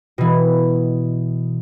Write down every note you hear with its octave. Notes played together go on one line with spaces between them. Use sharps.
B2 E3